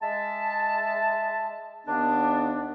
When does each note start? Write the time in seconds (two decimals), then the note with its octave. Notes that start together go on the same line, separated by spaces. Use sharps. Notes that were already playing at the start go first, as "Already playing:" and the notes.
0.02 G#3 E5 A5
1.86 D#2 B3 D4